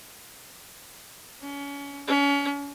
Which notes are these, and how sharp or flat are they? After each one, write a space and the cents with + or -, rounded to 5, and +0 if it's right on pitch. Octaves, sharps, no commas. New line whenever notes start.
C#4 +30
C#4 +35